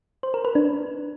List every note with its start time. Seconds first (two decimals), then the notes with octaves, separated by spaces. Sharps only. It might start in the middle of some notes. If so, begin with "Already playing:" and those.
0.23 C5
0.34 A#4
0.45 B4
0.55 D4